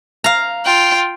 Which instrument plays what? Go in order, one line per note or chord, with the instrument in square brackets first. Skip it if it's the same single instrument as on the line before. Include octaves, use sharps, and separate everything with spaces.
[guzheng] F5 A#5
[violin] F4 G5